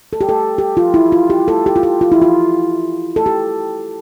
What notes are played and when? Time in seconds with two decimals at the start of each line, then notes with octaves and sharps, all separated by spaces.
0.13 A4
0.21 G4
0.29 A4
0.58 G4
0.77 F4
0.94 E4
1.12 F4
1.30 G4
1.48 A4
1.66 G4
1.76 F4
1.83 G4
2.01 F4
2.12 E4
2.22 F4
3.16 A4
3.26 G4